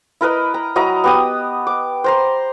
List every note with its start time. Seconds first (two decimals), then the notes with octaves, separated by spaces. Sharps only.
0.21 E4 A#4 B4 D#5
0.54 A#5
0.76 F#3 E4 D#5 A#5
1.04 B3 G4 D#6
1.67 D6
2.04 C5 A#5 C6